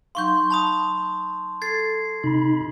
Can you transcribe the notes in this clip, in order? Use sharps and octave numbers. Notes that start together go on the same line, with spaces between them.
F#3 D#4 F5 C6 C#6 G6
A5 B5 D#6
A4 G#6 A6 C7
C3 D#4 B5